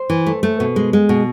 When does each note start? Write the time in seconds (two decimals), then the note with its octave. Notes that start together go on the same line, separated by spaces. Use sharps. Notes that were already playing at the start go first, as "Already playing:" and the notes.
Already playing: C5
0.10 E3
0.26 A3
0.43 A3
0.60 B2
0.76 G#3
0.93 G#3
1.09 B2